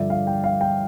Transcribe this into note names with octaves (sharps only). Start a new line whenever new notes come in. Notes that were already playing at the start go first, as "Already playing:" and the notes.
Already playing: G2 D3 F3 D5 E5
F5
G5
F5
G5